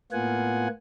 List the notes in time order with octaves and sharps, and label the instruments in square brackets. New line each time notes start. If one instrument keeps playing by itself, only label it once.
[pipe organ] A2 A#3 B3 F4 F#5 G#5